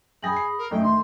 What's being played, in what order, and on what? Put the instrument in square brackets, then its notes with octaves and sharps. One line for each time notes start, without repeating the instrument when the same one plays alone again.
[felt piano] F#2 G5 A#6 [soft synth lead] G#4 [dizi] G#5 [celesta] B5 D#6 F#7
[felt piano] C7
[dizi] A#4
[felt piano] F#2 D#4 [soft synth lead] A3 [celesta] A4 [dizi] G5
[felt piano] D#3 [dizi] C6